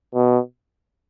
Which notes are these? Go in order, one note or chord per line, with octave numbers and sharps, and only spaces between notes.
B2